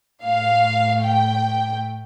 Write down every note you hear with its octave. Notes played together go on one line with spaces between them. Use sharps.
A2 A3 F5
G5